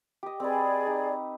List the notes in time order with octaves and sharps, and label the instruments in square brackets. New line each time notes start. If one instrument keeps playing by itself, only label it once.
[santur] G4 D#5
[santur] C4 B4 [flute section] G#4 D5
[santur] D#4